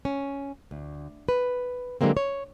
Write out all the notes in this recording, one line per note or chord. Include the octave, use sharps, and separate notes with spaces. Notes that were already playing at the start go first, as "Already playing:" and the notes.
C#4
D2
B4
D3 F#3 G#3 A#3 C4
C#5